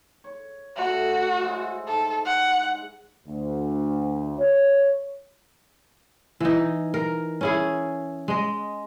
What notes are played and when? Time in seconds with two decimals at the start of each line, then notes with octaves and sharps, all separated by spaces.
0.24 C#5
0.77 G3 A3 E4 F#4
1.42 G#3 E4 C5
1.88 G#2 A4
2.26 F#5
3.25 D2
4.38 C#5
6.40 E3 D#4
6.94 A#4
7.41 C#4 E4 G#4
8.28 G#3 D#5